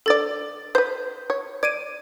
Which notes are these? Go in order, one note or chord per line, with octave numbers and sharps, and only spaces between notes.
D3 A4 D5 A6
B4 C5 G6
C#5
D5 G#6 D7 D#7